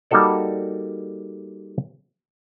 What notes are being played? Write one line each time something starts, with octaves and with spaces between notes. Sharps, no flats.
G3 A#3 D#4 F#4 A4 D5